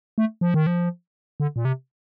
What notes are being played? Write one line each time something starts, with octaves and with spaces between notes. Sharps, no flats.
A3
F3
D#3
F3
D3
A#2
C3